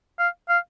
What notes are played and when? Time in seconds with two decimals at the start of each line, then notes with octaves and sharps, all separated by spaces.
0.19 F5
0.49 F5